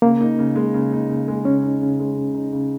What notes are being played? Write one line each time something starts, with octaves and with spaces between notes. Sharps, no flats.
C#3 A#3
D#4
C#3
G#3
C#3
D#4
C#3
G#3
C#3 C#4
D#4
C#3
G#3
C#3
D#4
C#3